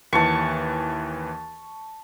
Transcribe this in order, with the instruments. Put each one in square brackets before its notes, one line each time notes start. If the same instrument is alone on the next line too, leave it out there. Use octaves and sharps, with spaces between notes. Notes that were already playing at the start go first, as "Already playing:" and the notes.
[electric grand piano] D#2 E3 [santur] A5 C#6